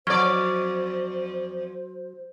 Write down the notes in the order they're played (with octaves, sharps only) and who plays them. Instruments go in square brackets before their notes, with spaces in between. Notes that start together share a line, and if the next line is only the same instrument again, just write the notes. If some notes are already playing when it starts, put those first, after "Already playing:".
[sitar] F2 D5 [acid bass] F#3 [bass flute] C5 [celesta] C#6 F6 G#6